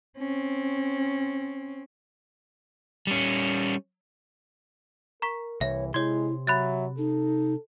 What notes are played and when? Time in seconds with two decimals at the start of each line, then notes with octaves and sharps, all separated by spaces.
0.17 C4 C#4
3.07 G3 C#4
5.22 A#4 A#5 C#6 B6
5.61 C2 E3 C#5 E5
5.94 C3 G#3 E4 C#5 C6 G#6
6.47 F#3 E5 B5 F#6 A6
6.98 D#4 A4